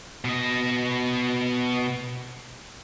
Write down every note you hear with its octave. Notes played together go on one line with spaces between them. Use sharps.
B2 D#5